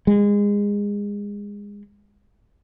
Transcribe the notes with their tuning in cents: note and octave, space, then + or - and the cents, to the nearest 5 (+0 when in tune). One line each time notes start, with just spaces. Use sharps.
G#3 -25